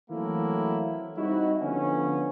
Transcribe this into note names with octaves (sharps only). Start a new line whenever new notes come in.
E3 F#3 A3 A#3 C4 E4
G3 C4 D#4 E4 F#4
D3 F3 B3 C#4